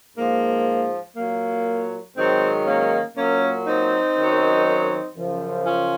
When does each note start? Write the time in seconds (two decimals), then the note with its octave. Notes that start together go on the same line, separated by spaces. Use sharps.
0.17 G#2 F3 A#3
1.16 A#2 F#3 A#3
2.16 G#2 D#3 F#3 C4
2.66 A#3 C#4
3.16 A#2 F#3 A#3 C#4
3.66 C4 D#4
4.16 F#2 D#3 F#3
5.16 F#2 C#3 F3
5.65 C#4 F4